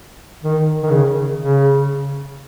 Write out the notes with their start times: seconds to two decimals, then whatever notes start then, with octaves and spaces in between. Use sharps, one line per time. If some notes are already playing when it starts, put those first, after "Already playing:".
0.42 D#3
0.83 D#3
0.90 C#3
1.38 C#3